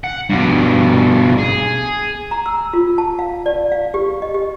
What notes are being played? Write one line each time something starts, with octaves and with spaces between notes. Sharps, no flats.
F#5
G2 B2
G#4
A#5
E6
F4
A5
F5
D5
F5
G4
D#5
G4